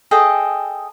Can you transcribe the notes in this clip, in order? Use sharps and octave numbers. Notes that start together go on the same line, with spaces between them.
G#4 A4 D#5 G5